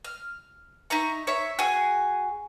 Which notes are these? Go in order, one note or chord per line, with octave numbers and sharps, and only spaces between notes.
F6
D#4 E5 A#5 C#6
C#5 E5
F#4 G#4 G#5